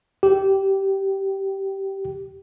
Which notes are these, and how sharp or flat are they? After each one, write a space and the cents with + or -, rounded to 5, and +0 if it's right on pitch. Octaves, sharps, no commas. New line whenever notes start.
G4 -15